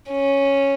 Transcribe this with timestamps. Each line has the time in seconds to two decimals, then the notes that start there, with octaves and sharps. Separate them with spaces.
0.10 C#4